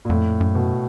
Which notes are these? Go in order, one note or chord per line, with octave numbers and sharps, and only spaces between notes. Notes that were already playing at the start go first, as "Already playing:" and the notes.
A#2
F2 A2
F#2
B2